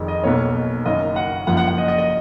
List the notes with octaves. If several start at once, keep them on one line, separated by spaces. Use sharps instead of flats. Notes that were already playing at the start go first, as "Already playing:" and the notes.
Already playing: F1 F2 D#3 G#3
D#5
B1 B2 A#3 C#4 C#5
F#1 F#2 D#3 D#5
F#5
F#1 F#2 F3 A#3 F#5
F#5
F#5
D#5
D#5
D#5